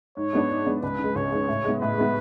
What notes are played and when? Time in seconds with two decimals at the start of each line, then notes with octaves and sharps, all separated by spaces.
0.17 G#2 C#5
0.33 G#3 B3 D4
0.50 G#2
0.66 G#3 B3 D4
0.83 C#2 B4
0.99 C#3
1.04 G#3
1.16 C#2 C#5
1.32 C#3 G#3
1.48 A2
1.65 G#3 B3
1.81 A2 B4
1.98 G#3 B3